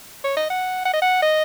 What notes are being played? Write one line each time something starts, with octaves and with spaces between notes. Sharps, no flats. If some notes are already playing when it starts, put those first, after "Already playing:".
C#5
D#5
F#5
F#5
D#5
F#5
D#5